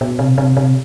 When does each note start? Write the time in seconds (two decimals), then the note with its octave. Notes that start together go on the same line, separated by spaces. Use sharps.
0.01 B2
0.19 C3
0.38 C3
0.57 C3